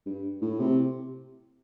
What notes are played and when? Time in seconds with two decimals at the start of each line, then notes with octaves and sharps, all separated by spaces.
0.06 G2
0.41 A2
0.60 C3